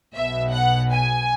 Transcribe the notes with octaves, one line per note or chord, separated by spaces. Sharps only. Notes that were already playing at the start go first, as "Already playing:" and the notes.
B1 B2 B3 E5
F#5
G#5